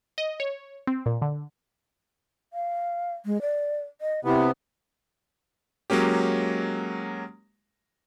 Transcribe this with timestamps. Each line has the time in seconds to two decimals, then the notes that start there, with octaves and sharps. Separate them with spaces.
0.18 D#5
0.40 C#5
0.87 C4
1.06 A#2
1.22 D3
2.53 F5
3.26 G#3
3.41 D5
4.01 D#5
4.25 C3 B3 E4
5.90 F#3 G#3 A#3 C#4 G4